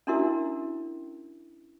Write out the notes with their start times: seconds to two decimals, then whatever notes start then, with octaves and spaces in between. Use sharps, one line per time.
0.07 C#4 D4 E4 F#4 A#4 E5